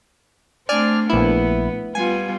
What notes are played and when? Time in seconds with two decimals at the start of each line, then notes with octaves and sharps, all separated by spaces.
0.69 A3 C4 D4 D5 G#5 F6
1.10 A#1 B3 E4
1.95 G3 B3 F4 G#5